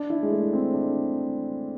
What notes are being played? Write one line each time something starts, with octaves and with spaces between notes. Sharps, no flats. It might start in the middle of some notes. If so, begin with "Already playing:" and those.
Already playing: D4
E4
G#3
A3
C4
D4